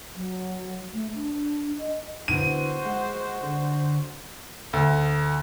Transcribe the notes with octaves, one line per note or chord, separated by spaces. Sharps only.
F#3
A3
D4
D#5
D3 E3 B3 F#4 C5 D#7
G#3 F#5
D3
D2